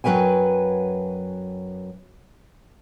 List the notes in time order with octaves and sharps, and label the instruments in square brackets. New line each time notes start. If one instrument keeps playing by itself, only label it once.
[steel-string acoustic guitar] F#2 F#3 G4 B4 G5 G#5